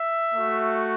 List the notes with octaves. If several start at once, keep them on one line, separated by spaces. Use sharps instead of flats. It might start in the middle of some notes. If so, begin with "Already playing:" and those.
Already playing: E5
A3 F#4